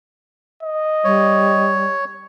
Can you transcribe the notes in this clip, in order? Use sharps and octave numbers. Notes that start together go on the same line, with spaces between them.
D#5
G3 C#5